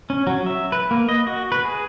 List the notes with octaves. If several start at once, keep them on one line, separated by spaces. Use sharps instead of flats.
C#4
F#3
E5
B4
A#3
D#5
F#4
B4
G#4